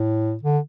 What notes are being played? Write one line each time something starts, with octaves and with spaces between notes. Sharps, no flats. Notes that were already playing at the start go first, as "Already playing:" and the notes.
Already playing: A2
D3